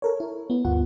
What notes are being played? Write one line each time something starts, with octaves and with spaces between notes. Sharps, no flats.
A4 A#4 C#5
E4
B3 E4
D2 G2 F4 F#5